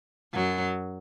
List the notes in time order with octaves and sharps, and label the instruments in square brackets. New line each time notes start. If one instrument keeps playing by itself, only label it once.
[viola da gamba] F#2 F#3